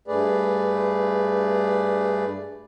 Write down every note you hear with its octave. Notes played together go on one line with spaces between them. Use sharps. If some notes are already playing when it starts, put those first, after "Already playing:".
G2 A3 G#4 B4 D5